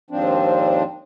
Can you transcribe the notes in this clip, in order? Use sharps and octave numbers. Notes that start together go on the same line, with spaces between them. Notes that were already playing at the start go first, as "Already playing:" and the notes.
D#2 G#2 F3 C4 D4